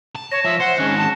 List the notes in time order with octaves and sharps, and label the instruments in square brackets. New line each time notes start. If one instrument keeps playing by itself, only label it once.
[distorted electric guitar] A5
[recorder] C#5 [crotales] A#6 E7
[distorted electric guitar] F3 [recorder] E5
[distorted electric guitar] C5 [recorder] F#5 [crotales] C#7
[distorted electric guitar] D#3 G#3 [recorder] C#4 [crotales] F#6
[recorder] A5